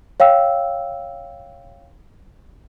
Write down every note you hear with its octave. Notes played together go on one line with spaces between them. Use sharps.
C#5 F5 G5 E6